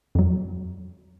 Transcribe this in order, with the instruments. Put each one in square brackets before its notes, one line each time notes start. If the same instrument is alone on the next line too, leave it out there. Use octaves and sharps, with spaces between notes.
[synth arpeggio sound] F2 F#3